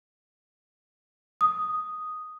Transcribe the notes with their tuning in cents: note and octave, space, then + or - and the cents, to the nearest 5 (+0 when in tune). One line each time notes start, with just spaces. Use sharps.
D#6 +0